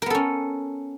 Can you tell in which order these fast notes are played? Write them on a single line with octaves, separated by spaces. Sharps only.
A#4 B3 A4 C#4